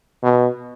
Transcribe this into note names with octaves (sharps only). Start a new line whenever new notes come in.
B2